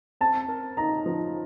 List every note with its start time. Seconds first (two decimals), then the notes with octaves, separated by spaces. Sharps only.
0.21 C4 A5
0.48 A#4
0.77 D#4 A#5
1.06 F3